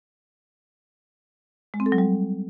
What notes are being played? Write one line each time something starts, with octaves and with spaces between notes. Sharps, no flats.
G#3
C4
A4
F#3
G3